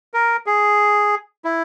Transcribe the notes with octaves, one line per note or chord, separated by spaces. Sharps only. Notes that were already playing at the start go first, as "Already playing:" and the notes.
A#4
G#4
E4